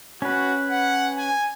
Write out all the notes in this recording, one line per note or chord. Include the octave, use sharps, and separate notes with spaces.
C#4 F#4 B4
F#5
G#5